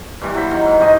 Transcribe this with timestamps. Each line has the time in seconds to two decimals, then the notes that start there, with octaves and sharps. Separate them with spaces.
0.22 G2 A#2 E3 G3
0.34 F#3 E4 C5 B5
0.51 D#3
0.66 G#2
0.79 G2 E3 D#4 D#5